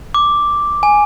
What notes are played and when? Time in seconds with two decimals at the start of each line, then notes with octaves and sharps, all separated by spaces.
0.14 D6
0.83 G#5